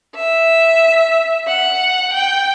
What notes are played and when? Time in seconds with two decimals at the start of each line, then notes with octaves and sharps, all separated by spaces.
0.15 E5
1.47 F#5
2.13 G5